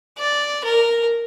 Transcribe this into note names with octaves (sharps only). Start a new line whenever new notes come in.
D5
A#4